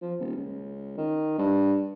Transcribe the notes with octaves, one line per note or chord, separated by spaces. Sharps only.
F3
D#1
C#2
D#3
G2